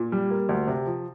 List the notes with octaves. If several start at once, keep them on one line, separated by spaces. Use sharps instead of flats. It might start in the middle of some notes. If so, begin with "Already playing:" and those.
Already playing: A#2
G3
A#3
D2
C3
F3